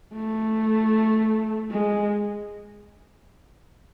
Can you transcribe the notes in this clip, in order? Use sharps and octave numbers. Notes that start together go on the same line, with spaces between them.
A3
G#3